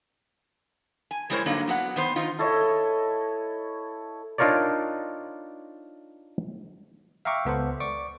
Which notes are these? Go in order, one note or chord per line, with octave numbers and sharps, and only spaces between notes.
G#5
G3 G#3 E4 A#4 C5 C#5
G2 D3 F#3 A#3 D#4
F#3 B3 A4 F#5
D#3 B3 C5
D#3 D#4 F4
E4 A4 C#5 D#5
D4 D#4 F4 A#4 C#5 D5
E5 F5 G5 A#5 C#6 D6
C#2 B3 A4 C5
D5 C#6 D6